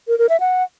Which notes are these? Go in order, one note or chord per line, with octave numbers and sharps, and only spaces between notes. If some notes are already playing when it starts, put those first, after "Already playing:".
A#4
A#4
E5
F#5